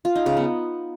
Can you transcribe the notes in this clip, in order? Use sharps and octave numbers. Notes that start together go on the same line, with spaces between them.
F4
D#4
C#3
B3